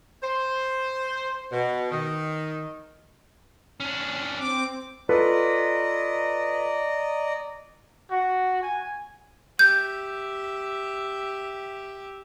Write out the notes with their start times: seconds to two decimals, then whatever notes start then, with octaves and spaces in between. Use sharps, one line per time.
0.23 C5
1.52 B2
1.91 D#3
3.80 C#4 D4
4.38 C4 D6
5.09 F4 A4 B4 D5 D#5 A#5
8.11 F#4
8.62 G#5
9.59 G4 E5 G6